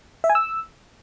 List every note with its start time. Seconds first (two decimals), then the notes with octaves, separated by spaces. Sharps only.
0.24 E5
0.30 G#5
0.35 E6